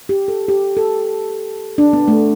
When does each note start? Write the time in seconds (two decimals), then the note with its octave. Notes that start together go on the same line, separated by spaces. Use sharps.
0.09 G4
0.28 A4
0.48 G4
0.77 A4
1.78 D4
1.93 B3
2.08 A3